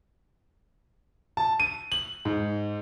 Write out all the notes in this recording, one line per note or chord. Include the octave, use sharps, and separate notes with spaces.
A5
D#7
F#7
G#2